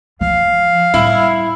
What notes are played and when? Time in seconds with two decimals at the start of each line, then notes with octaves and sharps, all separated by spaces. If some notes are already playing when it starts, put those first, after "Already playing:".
0.21 E3 F3 F5
0.94 A2 G3 E4